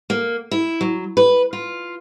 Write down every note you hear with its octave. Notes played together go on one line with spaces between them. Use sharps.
A#3
E4
F#3
B4
F4